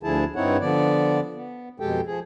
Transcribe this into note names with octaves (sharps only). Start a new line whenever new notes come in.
D2 D3 F3 E4 G#4 A5
G2 C4 D#4 E4 C#5 F#5
D3 F3 B3 D5
B3
F2 B2 G#3 G4 A4 G5
F3 G#4